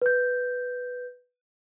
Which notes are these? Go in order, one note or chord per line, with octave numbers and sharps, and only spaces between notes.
B4 G6